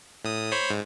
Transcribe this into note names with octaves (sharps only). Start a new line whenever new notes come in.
A2 D#6
C5 C#5 B5
G#2